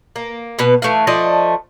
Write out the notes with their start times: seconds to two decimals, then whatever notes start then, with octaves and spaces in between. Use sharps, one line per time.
0.16 A#3
0.59 B2 B3 B4
0.82 E3 A3 E5 F5
1.07 F3 A3 D5 D#5